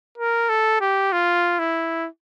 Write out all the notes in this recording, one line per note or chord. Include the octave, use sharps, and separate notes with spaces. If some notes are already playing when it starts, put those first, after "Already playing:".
A#4
A4
G4
F4
E4